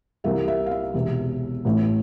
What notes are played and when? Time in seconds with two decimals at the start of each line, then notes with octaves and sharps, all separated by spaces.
0.24 C2 C3 E3 G3 A#3 E5
0.48 E5
0.66 F5
0.71 E5
0.94 E1 E2 C3
1.65 A1 A2 E3 A3